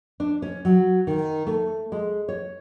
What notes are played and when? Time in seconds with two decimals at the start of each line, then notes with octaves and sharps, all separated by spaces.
0.20 D4
0.42 C#4
0.65 F#3
1.07 D#3
1.47 A3
1.92 G#3
2.28 C#5